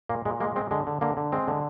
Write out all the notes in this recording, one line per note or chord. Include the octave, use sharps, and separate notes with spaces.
A#2 A#3
A#2 G#3
G#3 A#3
G#3 C4
D3 G#3
D3
D3 A#3
D3
G#3 C4
D3